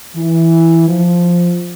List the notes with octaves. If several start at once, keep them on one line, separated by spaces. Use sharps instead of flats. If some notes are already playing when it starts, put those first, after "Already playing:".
E3
F3